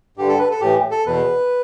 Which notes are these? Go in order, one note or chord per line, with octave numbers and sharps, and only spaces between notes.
G2 D3 G4
A4
B4
A4
A2 E3 G4
A4
E2 B2 B4